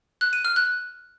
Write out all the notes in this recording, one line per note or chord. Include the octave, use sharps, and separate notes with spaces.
F#6
D#7
F6
F#6